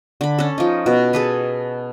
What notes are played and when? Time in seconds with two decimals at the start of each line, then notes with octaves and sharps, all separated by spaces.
0.21 D3 B5
0.38 C#4 A4
0.58 F3 D#4
0.86 B2
1.13 G#4 A4 B4